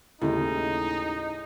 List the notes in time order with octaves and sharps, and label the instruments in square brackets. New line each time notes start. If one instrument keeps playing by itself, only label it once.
[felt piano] D#2 C#3 [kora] A2 G#3 [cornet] D#4 [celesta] E4